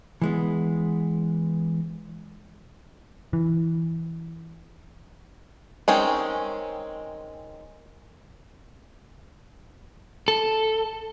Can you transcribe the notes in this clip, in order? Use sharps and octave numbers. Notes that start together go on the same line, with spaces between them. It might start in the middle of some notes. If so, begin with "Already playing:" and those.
E3 G#3 B3
E3
D#3 G#3 C4 C#4
A4